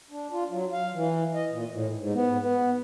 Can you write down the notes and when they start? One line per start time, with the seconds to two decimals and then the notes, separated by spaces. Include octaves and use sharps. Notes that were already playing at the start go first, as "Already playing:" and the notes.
0.11 D4
0.32 F4
0.50 F#3
0.73 F5
0.94 E3
1.34 D#5
1.51 A#2
1.71 A2
1.96 G#2
2.14 B3
2.38 B3